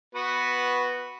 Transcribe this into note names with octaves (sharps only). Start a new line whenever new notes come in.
B3 F#4 B4